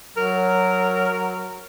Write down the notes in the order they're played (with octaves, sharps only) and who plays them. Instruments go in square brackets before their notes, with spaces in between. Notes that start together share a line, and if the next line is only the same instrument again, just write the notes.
[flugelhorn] F#3 [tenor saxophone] A#4